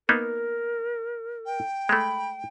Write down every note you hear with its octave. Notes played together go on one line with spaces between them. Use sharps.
A#3 B3 D#4 A#4
G5
G#3 A3 B5